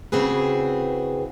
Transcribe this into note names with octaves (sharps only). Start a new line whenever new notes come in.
C#3 E3 C4 F#4 G#4 B4